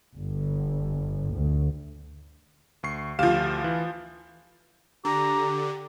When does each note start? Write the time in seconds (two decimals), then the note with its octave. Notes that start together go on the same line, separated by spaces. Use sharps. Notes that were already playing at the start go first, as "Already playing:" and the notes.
0.15 G1
1.35 D2
2.83 D2 C#6 C7
3.19 D2 F3 G4 F5 E7
3.64 E3
5.05 D3 G4 A#5